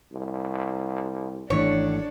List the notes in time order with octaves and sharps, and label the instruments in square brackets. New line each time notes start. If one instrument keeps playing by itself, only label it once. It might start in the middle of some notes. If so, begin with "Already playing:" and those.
[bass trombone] C2
[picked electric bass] G#1 E3 A3 [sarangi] D4 [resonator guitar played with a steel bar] C#5